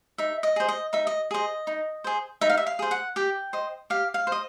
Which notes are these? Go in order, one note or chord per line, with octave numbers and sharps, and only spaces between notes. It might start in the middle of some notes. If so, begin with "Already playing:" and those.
D#4 E5
D#5
G#4 C5
D#5
D#4 E5
D#5
G#4 C5 D#5
D#4
G#4 C5
D#4 E5
F5
E5
F5
G#4 C5
F#5
G4 G5
C5 D#5
G4 F5
F5
C5
D#5